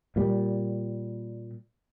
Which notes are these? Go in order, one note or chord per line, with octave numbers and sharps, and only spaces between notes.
A#2 G3